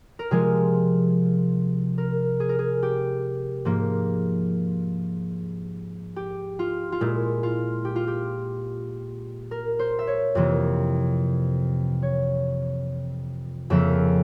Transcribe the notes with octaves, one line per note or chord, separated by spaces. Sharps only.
A#4
C3 F3 G#3 G#4
A#4
G#4
A#4
G#4
G4
G#2 F3 A#3
G4
F4
F4
A#2 G#3 E4
F4
G4
F4
G4
A#4
C5
E5
C#5
F2 C3 E3 A#3
C#5
F2 C#3 F3 A#3 E5